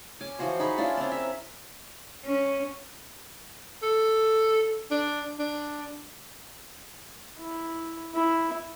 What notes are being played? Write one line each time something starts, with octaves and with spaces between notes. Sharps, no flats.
C#4 G#5 D6
E3 F3 F#4 C5
D#4 G#4 B5 C#6
C#4 D4 E4 F4
C4 C#4
A#4 E5
C#4
A4
D4
D4
E4
E4